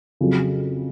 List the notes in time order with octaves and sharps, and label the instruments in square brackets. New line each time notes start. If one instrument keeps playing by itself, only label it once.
[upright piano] F2 C#3 F#3